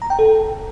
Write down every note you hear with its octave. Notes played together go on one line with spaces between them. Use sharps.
A#5
G5
A4